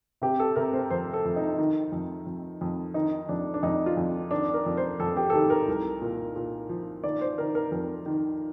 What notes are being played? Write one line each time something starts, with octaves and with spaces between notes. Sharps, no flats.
C3 G4
A4
C3 A#4
C5
F2 C5
A4
F2
D#4
D#3
F2
F2
F2
D#3 D#4
F2 D4
D4
F2 D#4
F4
F2
D#3 D4
A#4
F2
C5
F2 A4
G4
A4
D#3 G4
A#4
C2
A#2
A#2
F3
D#3 D5
C5
D#3 A#4
A#4
F2 A#4
D#3